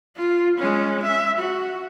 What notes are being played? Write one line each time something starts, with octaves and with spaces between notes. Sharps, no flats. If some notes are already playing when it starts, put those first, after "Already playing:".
F4
G#3 C#4
E5
F#4